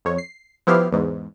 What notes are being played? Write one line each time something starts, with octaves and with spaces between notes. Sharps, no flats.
F2 C#5
C7
F3 B3 E4 G4 F6 C7
E2 G#2